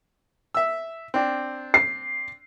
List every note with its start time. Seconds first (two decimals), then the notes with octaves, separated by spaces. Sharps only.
0.54 E5 E6
1.14 C4 D4
1.74 C7